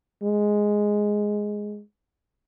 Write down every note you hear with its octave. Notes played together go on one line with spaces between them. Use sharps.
G#3